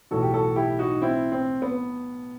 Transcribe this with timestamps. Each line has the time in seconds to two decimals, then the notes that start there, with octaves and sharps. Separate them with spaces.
0.11 B1 A2 E3 F#4 A4
0.23 G4
0.34 F#4 A4
0.56 E4 G4
0.79 D#4 F#4
1.02 C4 E4
1.32 C4
1.62 B3